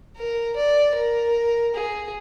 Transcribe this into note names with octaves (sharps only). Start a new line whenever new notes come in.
A#4
D5
A#4
G#4